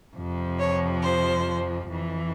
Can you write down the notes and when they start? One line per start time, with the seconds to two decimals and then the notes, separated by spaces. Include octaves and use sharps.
0.16 F2 C3 F3
0.59 C#5
1.02 C5
1.89 F2 E3